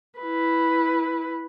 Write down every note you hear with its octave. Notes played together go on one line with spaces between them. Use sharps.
E4 B4